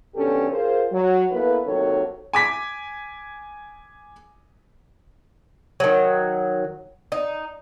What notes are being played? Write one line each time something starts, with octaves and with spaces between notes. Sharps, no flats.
F2 B2 D3 C#4 G4 A4
F4 G#4 A#4 C5
F#3
A#3 B3 E4 A4 B4
D#2 C3 D#3 F#3 A4 C#5
G#5 D6 B6
D#3 F#3
D#4